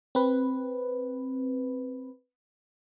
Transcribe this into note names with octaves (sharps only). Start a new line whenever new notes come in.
C4 B4